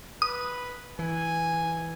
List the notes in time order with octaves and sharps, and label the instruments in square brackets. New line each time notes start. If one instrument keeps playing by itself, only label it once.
[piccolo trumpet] B4 [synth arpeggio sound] D#6
[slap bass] E3 [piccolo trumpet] G#5